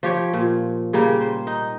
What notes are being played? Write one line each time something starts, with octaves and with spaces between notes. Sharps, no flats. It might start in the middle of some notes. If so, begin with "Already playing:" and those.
F3 G4 C#5
A#2
C#3 G3 A#3 G4
C5
D#4